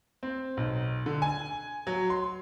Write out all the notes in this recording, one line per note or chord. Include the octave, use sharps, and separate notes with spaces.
C4
B1
D3
G#5
F#3
C6